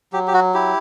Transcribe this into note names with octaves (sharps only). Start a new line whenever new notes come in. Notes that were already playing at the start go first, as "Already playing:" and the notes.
F#3 G4
G4
F#4
E4 G4